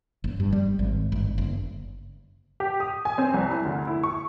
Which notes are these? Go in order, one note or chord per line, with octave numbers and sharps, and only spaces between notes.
F#1
G2
G3
G#1
G1
F#1
G4
D#6
G#5
C4
C2
E4
D2
E4
C#6